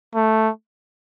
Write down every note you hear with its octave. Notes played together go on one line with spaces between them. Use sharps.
A3